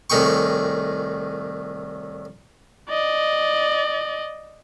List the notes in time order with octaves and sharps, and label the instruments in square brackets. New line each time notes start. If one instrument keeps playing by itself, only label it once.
[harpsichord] C2 A2 D#3 G#4 G5 C#6
[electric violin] D5 D#5